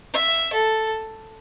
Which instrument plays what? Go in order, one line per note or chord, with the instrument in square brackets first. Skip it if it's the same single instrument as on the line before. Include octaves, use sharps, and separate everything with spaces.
[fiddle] E5
A4